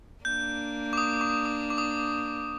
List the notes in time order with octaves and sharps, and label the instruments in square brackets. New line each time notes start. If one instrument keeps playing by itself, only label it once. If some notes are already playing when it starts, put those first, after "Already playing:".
[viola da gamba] A#3 D4 [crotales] G6
[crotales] D6
D#6
D6
D#6
D6
D#6